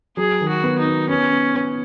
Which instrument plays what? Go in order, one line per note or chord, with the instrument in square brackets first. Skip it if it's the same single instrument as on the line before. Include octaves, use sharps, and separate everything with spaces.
[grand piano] F#3 [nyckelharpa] G#4
[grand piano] D#3
[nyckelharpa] F#4
[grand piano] B3
[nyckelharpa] D#4
[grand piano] B3
[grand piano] B3 [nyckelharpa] C#4
[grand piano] B3
B3